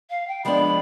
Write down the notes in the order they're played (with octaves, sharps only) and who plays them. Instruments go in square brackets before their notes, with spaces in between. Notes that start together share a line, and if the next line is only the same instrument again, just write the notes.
[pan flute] F5
G5
[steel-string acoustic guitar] F3 G#3 B3 D4 [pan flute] B5